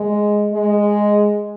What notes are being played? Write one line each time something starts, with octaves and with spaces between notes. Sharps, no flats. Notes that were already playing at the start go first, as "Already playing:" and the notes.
Already playing: G#3
G#3